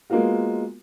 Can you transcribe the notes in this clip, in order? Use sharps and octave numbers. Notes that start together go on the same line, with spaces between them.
G#3 A#3 B3 F4 F#4